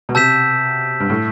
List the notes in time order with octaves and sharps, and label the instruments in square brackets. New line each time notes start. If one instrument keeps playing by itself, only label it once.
[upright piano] B2
[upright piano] C3 [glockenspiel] A5 E6 G6 B6 E7
[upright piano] G2
A2